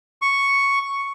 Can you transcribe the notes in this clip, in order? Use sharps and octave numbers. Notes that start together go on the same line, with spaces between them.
C#6